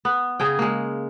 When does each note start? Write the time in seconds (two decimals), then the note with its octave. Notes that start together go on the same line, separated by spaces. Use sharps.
0.05 B3
0.40 C#3 G#4 G5
0.59 G#3 A#3